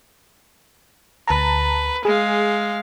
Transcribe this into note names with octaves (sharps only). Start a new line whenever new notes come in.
D2 B4 A5 A#5
G#3 G#4 F5